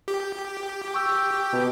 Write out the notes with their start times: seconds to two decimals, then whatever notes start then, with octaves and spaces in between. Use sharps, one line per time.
0.08 G4
0.94 G5 C#6 E6
1.53 B2